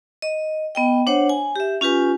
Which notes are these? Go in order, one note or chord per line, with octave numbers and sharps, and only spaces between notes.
D#5
B3 D#5 G5
D4 C5 C#5 F#5
G#5
G4 E5
C#4 F4 G4 B4 G#5